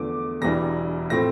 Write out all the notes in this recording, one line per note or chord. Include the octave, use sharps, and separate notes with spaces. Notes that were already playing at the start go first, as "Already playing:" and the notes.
Already playing: E2 D3 F3 A3 D6
E1 E2 E3 G3 D4 A#6
A2 F3 A3 C4 A#6